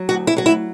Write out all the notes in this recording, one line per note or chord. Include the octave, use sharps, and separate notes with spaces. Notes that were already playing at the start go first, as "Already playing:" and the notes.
Already playing: F#3
D2 F#4
E4
F#3 F#4
E4